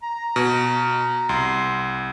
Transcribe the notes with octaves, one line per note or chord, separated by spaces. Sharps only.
A#5
B2
C2 C6